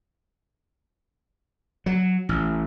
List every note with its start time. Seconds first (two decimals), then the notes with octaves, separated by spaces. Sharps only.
1.86 F#3
2.29 A1